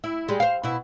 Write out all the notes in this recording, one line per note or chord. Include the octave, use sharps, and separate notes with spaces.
E4
G3 G#3
C5 F5
B2 E4